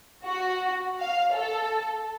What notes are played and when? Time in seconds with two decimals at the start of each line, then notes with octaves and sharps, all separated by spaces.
0.24 F#4
1.00 F5
1.33 A4